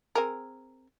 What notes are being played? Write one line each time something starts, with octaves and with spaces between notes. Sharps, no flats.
C4 G#4 A#4